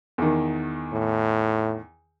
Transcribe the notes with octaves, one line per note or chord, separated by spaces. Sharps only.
E2 D#3
A2